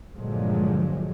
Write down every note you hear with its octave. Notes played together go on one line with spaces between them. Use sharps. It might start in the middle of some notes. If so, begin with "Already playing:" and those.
G2 A#2 D3 F3 F#3 G#3